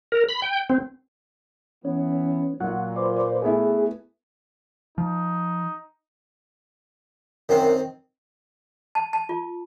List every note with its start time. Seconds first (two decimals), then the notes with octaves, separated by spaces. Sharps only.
0.12 A#4
0.29 B5
0.42 G5
0.70 C4
1.85 E3 B3 C#4
2.60 A#2 F#3 F4 F#5
2.96 B4 C5 D5
3.42 A3 B3 E4 G#4
4.98 F3 D#4
7.49 F#2 D#3 C4
8.95 A5
9.13 A5
9.29 F4